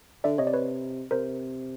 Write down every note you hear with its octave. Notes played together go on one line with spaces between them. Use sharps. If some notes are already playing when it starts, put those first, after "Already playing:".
D3 D5 E5
C3 C#5 D#5
D5
B4 C#5
C3 A#4 C5